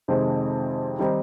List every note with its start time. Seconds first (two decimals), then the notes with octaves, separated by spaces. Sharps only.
0.08 F2 C3 D#3 G#3 C4
0.99 D#3 G3 C4 D#4